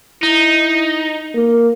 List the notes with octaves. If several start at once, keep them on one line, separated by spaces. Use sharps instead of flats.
D#4 E4
A#3